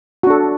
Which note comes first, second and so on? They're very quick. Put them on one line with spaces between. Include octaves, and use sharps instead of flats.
F#4 D4 A4